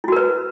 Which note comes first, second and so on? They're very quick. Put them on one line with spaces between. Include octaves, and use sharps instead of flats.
E4 F#4 A#4 B4